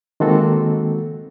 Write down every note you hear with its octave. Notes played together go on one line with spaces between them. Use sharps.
D#3 G#3 A#3 C4 F#4 A4